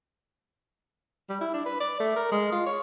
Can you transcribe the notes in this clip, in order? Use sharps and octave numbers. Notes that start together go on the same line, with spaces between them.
G3
E4
D4
B4
D5
A3
A#4
G#3
F4
C#5